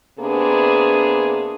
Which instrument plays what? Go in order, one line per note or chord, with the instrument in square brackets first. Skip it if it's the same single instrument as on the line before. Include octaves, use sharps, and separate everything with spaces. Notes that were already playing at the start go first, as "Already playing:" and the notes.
[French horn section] C3 A#3 B3 D4 G#4